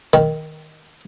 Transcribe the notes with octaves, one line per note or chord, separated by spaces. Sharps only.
D#3